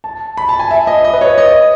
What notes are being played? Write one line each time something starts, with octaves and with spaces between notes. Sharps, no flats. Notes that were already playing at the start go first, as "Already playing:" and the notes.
A5
B5
A5
G#5
E5
D#5
D#5
B4
C#5
D#5